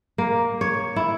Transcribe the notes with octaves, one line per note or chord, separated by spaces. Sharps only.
A#3
C#5
E4